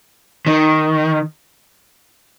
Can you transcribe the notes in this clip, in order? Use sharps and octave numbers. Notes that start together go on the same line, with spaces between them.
D#3